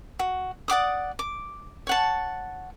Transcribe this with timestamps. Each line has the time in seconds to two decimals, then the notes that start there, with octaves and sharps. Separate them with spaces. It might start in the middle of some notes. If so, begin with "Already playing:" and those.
0.19 F#4
0.68 D5 F#5 D6 D#6
1.19 D6
1.87 C#5 F#5 A5